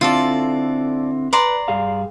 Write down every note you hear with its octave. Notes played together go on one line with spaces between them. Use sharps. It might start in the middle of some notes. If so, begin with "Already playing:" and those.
D3 C4 E4 F4 A4 D5
B4 D5 A#5 C6
G2 G#4 F5